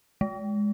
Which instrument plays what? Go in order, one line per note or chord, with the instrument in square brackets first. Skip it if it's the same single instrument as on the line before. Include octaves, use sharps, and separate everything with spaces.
[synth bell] G#3